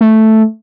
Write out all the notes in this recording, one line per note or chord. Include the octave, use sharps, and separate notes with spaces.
A3